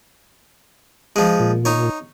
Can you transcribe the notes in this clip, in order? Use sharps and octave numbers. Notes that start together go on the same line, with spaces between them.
F3 G#3
A#2
D#4 C#5